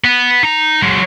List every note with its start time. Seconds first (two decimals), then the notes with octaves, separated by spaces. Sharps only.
0.04 B3
0.43 D#4 A#5
0.83 F#3 G#3